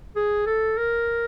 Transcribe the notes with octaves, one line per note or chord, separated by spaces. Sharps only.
G#4
A4
A#4